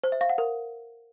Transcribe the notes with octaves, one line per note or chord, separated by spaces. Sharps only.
C5
E5
F5
F#5
A#4